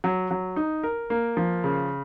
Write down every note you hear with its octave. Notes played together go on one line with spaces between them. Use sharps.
F#3
F#3
D#4
A#4
A#3
F3
C#3